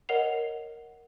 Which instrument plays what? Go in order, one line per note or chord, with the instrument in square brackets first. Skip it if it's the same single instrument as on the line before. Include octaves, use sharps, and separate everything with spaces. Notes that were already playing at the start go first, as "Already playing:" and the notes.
[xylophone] A#4 C#5 D#5 F#5 C7 F7